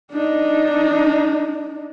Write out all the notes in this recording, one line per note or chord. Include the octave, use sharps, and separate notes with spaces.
D4 D#4